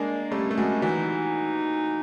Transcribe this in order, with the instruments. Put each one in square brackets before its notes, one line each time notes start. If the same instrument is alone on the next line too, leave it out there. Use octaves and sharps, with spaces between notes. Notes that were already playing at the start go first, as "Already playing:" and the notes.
Already playing: [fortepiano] G#3 A#3 [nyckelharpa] D4
[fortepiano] G3 A3 [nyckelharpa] C#4
[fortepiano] A3
F#3 G#3
[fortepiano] E3 F#3 [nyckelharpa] D#4